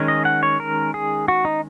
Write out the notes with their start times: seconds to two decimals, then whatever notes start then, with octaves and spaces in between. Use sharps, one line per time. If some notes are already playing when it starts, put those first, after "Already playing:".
Already playing: D#3 G#3 C#4
0.08 D#5
0.25 F#5
0.43 C#5
0.60 A#4
0.94 G#4
1.28 F#4
1.45 D#4